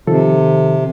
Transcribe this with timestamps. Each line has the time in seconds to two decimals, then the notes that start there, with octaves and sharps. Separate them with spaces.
0.07 C3 D#3 F3 A4